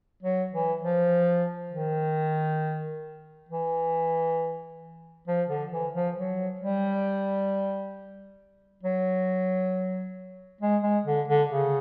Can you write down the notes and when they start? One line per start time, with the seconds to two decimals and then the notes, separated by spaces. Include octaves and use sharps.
0.23 F#3
0.52 E3
0.82 F3
1.71 D#3
3.49 E3
5.27 F3
5.49 D3
5.71 E3
5.94 F3
6.16 F#3
6.61 G3
8.83 F#3
10.61 G#3
10.83 G#3
11.05 D3
11.28 D3
11.50 C#3